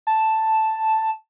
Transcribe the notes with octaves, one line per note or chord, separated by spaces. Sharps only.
A5